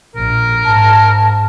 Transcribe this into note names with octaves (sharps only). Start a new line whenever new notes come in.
A#1 A#4
G#2 A5